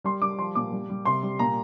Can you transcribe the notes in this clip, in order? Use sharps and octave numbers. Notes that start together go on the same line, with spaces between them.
G3 C6
G3 D6
F3 C6
A#2 D6
G3
G3
C3 C6
G3
A#2 A#5